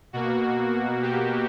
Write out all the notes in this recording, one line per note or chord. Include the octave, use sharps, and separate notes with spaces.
B2 A#3 F#4
G4